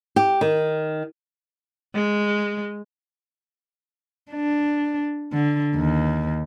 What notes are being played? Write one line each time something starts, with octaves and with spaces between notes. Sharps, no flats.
G4
D#3
G#3
D4
D3
D#2